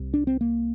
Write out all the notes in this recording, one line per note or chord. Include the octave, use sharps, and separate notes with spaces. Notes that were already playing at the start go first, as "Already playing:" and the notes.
Already playing: C2 C3
D4
C4
A#3